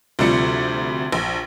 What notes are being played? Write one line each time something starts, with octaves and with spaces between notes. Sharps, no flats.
D2 C3 F3 G3 C#7
A#1